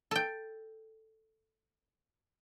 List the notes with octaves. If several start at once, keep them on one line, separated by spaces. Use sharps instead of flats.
A4 G5